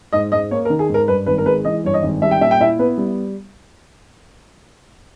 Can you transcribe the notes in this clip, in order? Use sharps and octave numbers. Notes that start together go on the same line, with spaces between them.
G#2 D#5
G#2 D#5
A#3 C#5
A#4
D#3
G#4
G#2
A#4
G2 B4
G#1 B4
A#4
G#3 B4
E3 D#5
G2 C#5
D#5
G#1
G3 E5
G5
A#2 E5
G5
E4 E5
B3 B4
G3